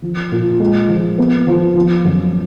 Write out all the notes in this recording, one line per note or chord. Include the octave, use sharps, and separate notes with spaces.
F3
A#2
G#3
F3
B3
F3
F3
F#2